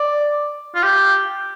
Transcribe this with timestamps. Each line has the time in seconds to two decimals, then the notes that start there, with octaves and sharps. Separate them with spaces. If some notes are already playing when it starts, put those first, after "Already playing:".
Already playing: D5
0.75 F4
0.83 G4